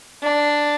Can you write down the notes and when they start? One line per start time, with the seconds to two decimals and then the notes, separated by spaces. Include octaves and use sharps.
0.23 D4